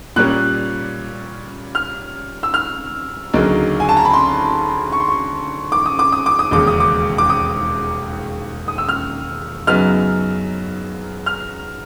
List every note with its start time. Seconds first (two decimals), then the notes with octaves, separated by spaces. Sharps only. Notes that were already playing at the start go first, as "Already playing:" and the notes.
0.16 A#2 G3 A#3 C#4 F#6
1.75 F6
2.43 E6
2.54 F6
3.33 D2 C#3 F#3 A#3 D#4
3.80 G#5
3.89 A5
3.97 A#5
4.05 B5
4.13 C6
4.92 C#6
5.00 C6
5.08 C#6
5.72 D6
5.86 D#6
5.99 D6
6.12 D#6
6.26 D6
6.39 D#6
6.51 E1 D#2 C#3 D6
6.67 D#6
6.80 D6
7.18 D6
7.30 D#6
8.68 D#6
8.78 E6
8.89 F6
9.67 F#2 C#3 F#3 B3 D#4 F6
11.26 F6